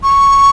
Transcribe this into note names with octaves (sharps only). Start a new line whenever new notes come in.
C#6